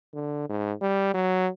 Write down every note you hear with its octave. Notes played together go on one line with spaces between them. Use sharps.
D3
G#2
G3
F#3